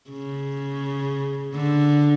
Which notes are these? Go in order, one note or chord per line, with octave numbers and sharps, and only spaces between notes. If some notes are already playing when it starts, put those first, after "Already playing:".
C#3
D3